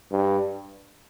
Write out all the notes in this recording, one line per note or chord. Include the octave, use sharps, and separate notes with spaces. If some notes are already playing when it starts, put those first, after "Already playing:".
G2